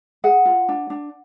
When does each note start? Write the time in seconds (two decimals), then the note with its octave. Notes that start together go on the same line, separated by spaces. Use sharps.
0.24 G#4 F#5
0.45 F4
0.69 D4
0.90 D4